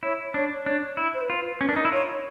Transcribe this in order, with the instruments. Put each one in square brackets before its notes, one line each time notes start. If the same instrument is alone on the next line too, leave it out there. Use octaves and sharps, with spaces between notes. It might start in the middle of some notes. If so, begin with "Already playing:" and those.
[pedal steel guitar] E4 [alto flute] C#5
[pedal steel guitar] D4 [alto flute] C#5
[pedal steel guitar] D4 [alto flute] C#5
[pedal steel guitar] E4
[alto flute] C5
B4
[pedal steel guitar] F4
[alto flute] B4
[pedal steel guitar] C#4
[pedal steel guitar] D4 [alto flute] A#4
[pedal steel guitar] D#4
E4
[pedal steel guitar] F4 [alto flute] C#5